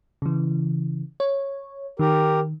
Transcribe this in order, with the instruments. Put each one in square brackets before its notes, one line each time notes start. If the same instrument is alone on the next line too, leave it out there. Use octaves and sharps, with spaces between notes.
[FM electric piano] C#3 E3
C#5
[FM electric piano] D#3 [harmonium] G4 A#4